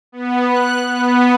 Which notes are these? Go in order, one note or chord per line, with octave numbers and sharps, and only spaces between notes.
B3
F#6
B3